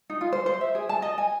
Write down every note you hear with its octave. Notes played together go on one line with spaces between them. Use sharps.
D#4
F4
C5
C5
E5
G#4
A5
D#5
G#5